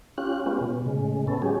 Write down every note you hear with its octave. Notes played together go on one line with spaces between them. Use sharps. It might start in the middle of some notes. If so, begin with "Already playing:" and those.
C#4 F4 G4 F#6
G#3 B3 C#4 F4 G4
B2
A2 C#3 G#3
B3 C#4 A4
F#3 G#3 C#4 G4 G#4